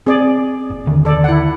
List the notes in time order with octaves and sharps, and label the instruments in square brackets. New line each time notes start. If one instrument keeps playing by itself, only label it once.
[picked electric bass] C4 [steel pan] G#4 D5
[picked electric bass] F#1
D#2 D3 D#3
[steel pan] A4 D5
E4 F#5